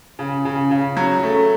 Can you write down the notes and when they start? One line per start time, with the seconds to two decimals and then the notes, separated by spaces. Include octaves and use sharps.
0.19 C#3
0.45 C#3
0.71 C#3
0.97 F#3
1.23 A3